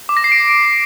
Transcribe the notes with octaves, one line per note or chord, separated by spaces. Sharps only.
D6
A#6
C7
D7